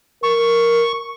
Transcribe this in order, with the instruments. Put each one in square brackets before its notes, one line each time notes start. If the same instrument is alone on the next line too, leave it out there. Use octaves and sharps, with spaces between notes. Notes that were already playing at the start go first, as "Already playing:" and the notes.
[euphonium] A#4 [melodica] C#6